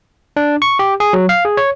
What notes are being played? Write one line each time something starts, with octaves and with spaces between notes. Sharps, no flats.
D4
C#6
G4
G#4
F#3
F5
G#4
C#5